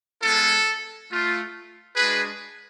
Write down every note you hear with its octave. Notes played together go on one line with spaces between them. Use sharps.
G#3 B3 F4 A4
A3 F4
G#3 D4 F#4 G#4 B4